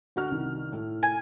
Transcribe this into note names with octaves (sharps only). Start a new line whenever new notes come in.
D2 F#4 F6
C2 D#3
A2
G#5